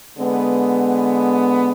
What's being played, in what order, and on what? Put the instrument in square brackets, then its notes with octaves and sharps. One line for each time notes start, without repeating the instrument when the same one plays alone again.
[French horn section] D3 G#3 B3